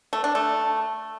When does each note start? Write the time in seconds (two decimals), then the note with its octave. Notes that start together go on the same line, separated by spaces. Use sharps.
0.13 A3
0.24 D4
0.35 A3